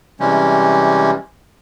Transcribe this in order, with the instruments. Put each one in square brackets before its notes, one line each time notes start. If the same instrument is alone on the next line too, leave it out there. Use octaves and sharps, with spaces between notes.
[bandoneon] C3 E3 G3 G#3 C#4